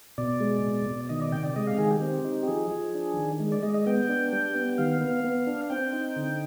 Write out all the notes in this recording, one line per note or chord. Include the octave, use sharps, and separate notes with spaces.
B2 D5
G#3
B2
B2
D#3 D#5
D5
C3 G5
D5
G#3 D#5
F5
D#3 G#4
G4
C4
D#4
F3 G#4
F3
D4
D#3
G#3
D5
G#3 D#5
D#5
B3 G5
D4
G3
B3
D#3 F5
B3
B3
D4
C4 G5
D#4
D3